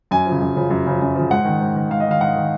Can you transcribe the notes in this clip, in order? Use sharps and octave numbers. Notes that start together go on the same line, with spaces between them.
F#2 G#5
F3
C#3
F#2
C#3 F3
F#2
C#3 F3
F#2
C#3 F3
G#2 F#5
D#3
G#2
D#3
G#2 F5
D#5
D#3
F5
G#2 F#5
D#3